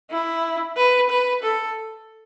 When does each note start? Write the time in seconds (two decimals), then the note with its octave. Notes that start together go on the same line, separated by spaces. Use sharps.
0.11 E4
0.77 B4
1.10 B4
1.43 A4